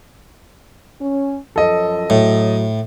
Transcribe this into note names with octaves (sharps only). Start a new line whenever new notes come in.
C#4
F#2 F3 A4 D#5
A2 F#3